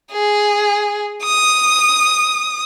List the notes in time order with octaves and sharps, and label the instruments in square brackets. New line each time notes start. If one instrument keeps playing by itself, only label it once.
[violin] G#4
D#6